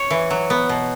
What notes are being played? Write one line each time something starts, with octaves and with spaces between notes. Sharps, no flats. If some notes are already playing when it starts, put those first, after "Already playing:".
Already playing: C#5
E3
F#3
B3
B2